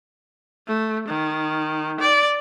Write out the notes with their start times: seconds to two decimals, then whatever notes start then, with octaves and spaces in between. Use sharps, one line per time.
0.67 A3
1.08 D#3
2.00 D5